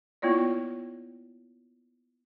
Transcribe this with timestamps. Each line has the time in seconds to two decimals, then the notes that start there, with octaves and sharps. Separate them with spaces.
0.22 A#3 B3 E4 F4 C#5 D5